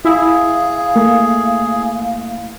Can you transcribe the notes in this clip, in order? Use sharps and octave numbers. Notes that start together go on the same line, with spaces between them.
E4 G#4 F5
A3 A#3